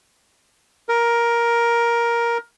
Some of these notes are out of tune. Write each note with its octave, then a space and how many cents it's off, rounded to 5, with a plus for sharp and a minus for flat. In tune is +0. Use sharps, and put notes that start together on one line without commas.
A#4 +10